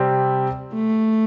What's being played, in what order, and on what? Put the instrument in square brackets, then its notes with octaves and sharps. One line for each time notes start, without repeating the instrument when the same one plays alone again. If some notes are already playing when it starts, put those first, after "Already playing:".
Already playing: [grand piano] C3 G3 C4
[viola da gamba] A3